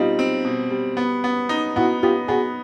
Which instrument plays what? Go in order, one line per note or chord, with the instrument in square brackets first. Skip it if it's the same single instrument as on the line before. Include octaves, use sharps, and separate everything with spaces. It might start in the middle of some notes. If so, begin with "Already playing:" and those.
Already playing: [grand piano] B2 G3 C4 [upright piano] D#4 F4
[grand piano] C4
B2
G3
B3
B3
D#4
[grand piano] B3 [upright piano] E4 F#4
[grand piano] B3 [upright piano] F4 G4
[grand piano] B3 [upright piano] F#4 G#4